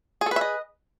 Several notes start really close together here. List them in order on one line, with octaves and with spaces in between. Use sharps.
G#4 A4 B4 E5 D#5